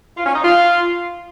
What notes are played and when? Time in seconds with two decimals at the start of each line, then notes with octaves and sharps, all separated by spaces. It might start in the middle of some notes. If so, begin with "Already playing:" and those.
0.17 F4
0.26 C#4
0.35 D#4
0.44 F4